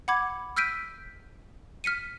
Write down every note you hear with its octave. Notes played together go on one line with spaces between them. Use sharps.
F#5 B5 D6 G#6
E6 F6 G6 B6 D7 D#7
F6 B6 C#7 D#7